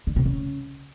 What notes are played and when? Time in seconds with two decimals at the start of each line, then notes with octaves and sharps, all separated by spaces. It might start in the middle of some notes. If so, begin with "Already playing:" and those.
0.07 D3
0.16 C3
0.25 C#3